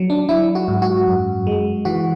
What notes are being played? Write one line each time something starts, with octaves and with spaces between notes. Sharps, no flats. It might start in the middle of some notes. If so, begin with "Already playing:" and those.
Already playing: F#3
D4
F#3 E4
F#4
G#2
F#4
F#2
G#3
E3 F#4